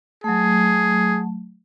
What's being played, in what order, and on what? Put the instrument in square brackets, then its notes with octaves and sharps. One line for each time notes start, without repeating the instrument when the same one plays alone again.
[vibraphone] F#3 A3 [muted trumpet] G#4